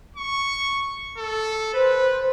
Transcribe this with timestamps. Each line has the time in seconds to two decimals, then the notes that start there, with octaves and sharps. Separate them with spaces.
0.16 C#6
1.18 A4
1.74 B4 C5